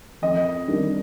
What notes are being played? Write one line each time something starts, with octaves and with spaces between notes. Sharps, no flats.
F2 D#5
D#3 G3 D4